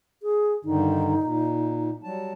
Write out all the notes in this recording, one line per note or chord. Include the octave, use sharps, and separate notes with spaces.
G#4
G2 D3 D#3 D#4
A#2
F#3 G3 A5